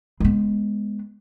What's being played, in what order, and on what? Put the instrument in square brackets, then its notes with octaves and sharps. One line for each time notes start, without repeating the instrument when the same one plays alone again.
[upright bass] G#3 B3